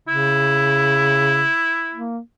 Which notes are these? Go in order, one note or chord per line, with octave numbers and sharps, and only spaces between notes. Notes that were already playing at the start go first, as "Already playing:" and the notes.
C#3 E4
A#3